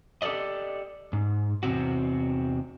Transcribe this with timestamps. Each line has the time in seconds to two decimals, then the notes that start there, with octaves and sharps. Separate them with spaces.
0.22 G4 A4 A#4 D5 D#5
1.13 G#2
1.63 E2 C3 C4 F#4